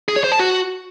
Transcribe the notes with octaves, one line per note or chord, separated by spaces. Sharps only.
G#4
C#5
C5
A5
F#4